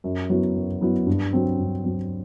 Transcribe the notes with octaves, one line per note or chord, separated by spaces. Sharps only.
F#2
F#3 B3 E4
F#2
F#3 B3 E4
G2
F#3 C4
G2
F#3 C4